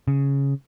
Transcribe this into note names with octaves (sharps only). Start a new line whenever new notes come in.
C#3